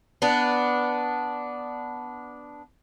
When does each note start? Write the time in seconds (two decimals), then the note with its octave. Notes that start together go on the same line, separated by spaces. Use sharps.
0.22 B3 D4